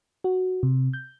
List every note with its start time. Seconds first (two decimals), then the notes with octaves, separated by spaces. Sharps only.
0.24 F#4
0.63 C3
0.93 G6